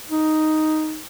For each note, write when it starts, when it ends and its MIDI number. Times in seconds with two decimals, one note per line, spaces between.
0.09 1.00 63